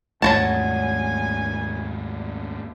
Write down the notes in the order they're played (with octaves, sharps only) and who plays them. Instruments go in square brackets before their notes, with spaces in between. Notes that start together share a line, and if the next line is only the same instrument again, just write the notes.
[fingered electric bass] D#2 G#2 A3 [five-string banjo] F#3 F#4 A5 [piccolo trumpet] G#5